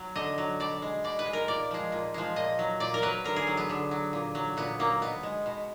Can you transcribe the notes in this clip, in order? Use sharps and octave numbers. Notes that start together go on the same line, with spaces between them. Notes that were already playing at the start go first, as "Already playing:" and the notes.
Already playing: F#3
D3 D#5
F#3
B2 D5
G#3
B2 D5
B4
G#3
A#4
A#2 D5
F3 G#3
A#2
F3 G#3
A#2 D#5
F#3
A#2 D5
A#4
F#3 B4
D3 A#4
G#4
F#3
B3
D3
F#3
A#2
F#3
A#2 B3
F#3 A#3
B2 B3
G#3
B2